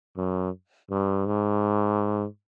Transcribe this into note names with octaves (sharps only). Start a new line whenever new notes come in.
F#2
G2
G#2